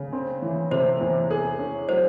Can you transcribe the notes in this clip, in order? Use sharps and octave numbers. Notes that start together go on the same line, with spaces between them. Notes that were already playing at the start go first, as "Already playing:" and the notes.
Already playing: C#3
C4
E3
C3 C5
E2
G#4
C#4
F#3 C5